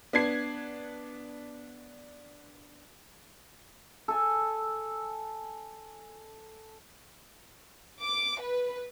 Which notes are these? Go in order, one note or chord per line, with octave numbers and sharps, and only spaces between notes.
B3 D4 G#6 C7
A4 G#5
D6
B4